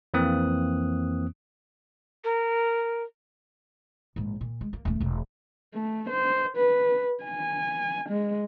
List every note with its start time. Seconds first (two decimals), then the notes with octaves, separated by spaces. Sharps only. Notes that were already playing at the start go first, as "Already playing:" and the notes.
0.14 F2 E3 A#3 C4 D#6 F#6
2.24 A#4
4.16 A#1 G#2
4.41 A#2
4.61 G#3
4.73 A#3
4.85 D#1 A3
5.00 E1 A3
5.74 A3
6.09 C5
6.57 B4
7.24 G#5
8.09 G#3